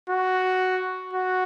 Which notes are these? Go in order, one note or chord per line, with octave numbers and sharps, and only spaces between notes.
F#4
F#4